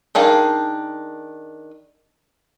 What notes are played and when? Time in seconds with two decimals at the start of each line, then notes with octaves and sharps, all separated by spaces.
0.15 D#3 D4 G#4 F5